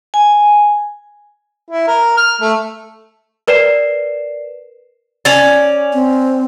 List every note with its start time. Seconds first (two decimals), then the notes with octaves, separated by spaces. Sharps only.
0.14 G#5
1.70 E4
1.87 A#4
2.17 F6
2.41 A3
3.48 A#4 B4 D5 C7 E7
5.25 C#4 D5
5.93 C4